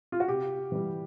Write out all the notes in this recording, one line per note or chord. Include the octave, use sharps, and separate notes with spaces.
F4
F#4
C3 G4
E3 G3